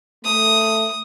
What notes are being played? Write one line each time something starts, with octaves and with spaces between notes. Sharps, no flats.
A3 D#6